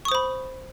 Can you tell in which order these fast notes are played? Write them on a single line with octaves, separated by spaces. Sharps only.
C#6 D#6 C5 B5